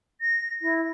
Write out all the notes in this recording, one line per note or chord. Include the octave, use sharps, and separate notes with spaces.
A#6
E4